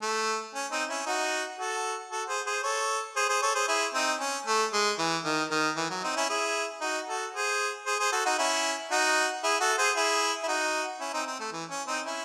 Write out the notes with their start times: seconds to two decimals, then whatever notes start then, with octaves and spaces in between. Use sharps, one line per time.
0.02 A3
0.55 C#4
0.72 C4 D#4
0.89 C#4 E4
1.06 D#4 F#4
1.58 F#4 A4
2.11 F#4 A4
2.29 G#4 C5
2.46 G#4 C5
2.63 A4 C#5
3.16 G#4 C5
3.29 G#4 C5
3.42 A4 C#5
3.55 G#4 C5
3.68 E4 G#4
3.94 C4 D#4
4.20 C#4
4.46 A3
4.73 G#3
4.99 E3
5.25 D#3
5.51 D#3
5.77 E3
5.90 F#3
6.03 C4 D#4
6.16 C#4 E4
6.29 E4 G#4
6.81 D#4 F#4
7.08 F#4 A4
7.34 G#4 C5
7.86 G#4 C5
8.00 G#4 C5
8.12 F#4 A4
8.26 D#4 F#4
8.38 C#4 E4
8.91 D#4 F#4
9.43 E4 G#4
9.61 F#4 A4
9.78 G#4 C5
9.96 E4 G#4
10.43 E4
10.48 D#4 F#4
11.00 C#4 E4
11.13 C4 D#4
11.27 C4
11.40 A3
11.52 E3
11.71 C#4
11.87 C4 D#4
12.05 C#4 E4